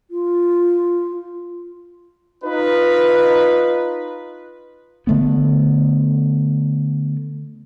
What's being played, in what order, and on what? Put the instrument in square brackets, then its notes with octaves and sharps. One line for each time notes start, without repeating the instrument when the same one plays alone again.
[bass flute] F4
[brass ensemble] D#4 F4 B4
[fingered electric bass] D3 A3 B3